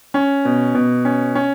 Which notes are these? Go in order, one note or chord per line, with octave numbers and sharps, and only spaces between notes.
C#4
B2
B2
C#4
C#4